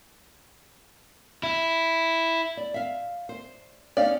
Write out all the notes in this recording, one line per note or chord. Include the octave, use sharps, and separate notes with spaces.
E4
D5
E5 F5
C5
C#4 D#4 D5 F5